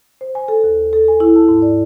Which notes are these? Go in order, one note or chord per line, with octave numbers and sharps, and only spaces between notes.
C5
G#5
A4
D#2
A4
G#5
E4
A5
G#2
D5